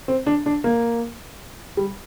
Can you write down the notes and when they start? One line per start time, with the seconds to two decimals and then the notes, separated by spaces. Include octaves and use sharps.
0.08 C4
0.26 D4
0.46 D4
0.64 A#3
1.77 G3